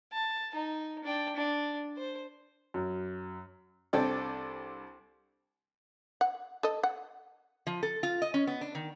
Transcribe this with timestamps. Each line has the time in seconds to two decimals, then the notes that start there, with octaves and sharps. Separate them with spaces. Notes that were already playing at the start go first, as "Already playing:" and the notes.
0.13 A5
0.55 D#4
1.04 D4 G5
1.36 D4
1.97 C5
2.74 F#2
3.93 C2 C4 D4 A4 D5 G5
6.21 F#5
6.63 A4 D#5
6.83 F#5
7.67 F3
7.83 A4
8.03 F4
8.22 D#5
8.34 C#4
8.47 B3
8.61 D4
8.75 D#3